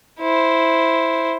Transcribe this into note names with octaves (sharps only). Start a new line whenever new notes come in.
E4 C5